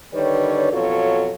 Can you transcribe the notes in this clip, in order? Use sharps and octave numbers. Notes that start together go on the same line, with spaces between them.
D3 D#3 G3 B4 C#5
F2 B2 F#3 F4 A4 C#5